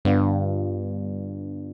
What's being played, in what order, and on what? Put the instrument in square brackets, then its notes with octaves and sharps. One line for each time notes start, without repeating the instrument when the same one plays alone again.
[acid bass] G2 [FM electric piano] D3 G3 B3 D4 F4